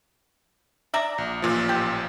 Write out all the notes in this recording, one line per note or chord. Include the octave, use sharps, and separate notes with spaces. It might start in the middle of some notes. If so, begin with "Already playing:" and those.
D5 E5 A#5
A#1
A1 A#2 F3
G4